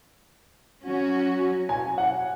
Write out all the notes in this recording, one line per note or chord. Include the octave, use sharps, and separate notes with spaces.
F#3 C#4 F#4
G#5
F#5